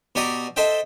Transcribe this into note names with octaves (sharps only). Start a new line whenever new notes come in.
B2 G4 D5 A#5 D#6
A4 C5 D#5 E5 G5